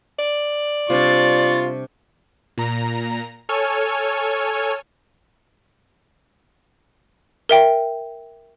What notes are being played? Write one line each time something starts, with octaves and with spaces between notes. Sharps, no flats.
D5
C3 G3 D4 F4 C#6 A6
A#2 A#5
A4 C#5 G#5 F6
A#4 E5 G5